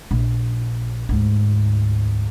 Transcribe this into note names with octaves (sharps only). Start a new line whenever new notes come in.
A#1
D2 G#2